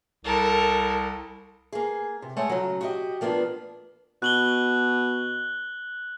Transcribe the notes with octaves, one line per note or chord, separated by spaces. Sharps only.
C2 A4 A#4
A#3 G#4
C3
G#3 A3 C#5 F#5
C#3 F#3
F#4 G4 D#5
F3 A#3 B3 D4
B2 F#6 F#7 G7